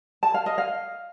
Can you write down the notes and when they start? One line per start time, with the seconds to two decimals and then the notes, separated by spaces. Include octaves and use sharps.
0.23 A5
0.34 F5
0.46 D#5
0.58 F5